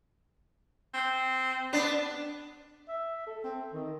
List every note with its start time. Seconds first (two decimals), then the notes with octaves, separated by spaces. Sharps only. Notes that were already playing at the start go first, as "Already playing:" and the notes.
0.94 C4
1.73 B3 D4
2.88 E5
3.26 A4
3.44 C4
3.73 D#3